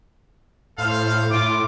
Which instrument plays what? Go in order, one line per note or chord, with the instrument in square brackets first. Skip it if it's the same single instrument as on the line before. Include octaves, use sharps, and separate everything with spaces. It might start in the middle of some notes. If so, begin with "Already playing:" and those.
[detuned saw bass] A2 [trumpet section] A4 C5 F5
[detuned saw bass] A2 [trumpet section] F4 [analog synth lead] D6